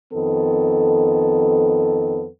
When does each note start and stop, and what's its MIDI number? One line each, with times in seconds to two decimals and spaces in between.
0.13 2.26 41
0.13 2.26 51
0.13 2.26 59
0.13 2.26 69